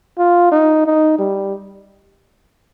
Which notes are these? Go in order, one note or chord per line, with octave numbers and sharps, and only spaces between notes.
F4
D#4
D#4
G3